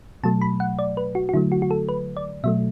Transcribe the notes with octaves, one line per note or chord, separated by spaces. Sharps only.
B2 F#3 A3 A5
B5
F#5
D5
B4
F#4
F#4
D3 F#3 A3 E4
F#4
F#4
A4
B4
D5
B2 F#3 A3 E5